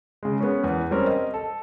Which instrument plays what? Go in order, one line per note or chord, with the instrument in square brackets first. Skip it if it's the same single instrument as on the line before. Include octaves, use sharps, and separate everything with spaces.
[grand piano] C#3 G#3
B3 C#4
E2 B4
G3 C4 C#4 G4 A#4
D#5
A4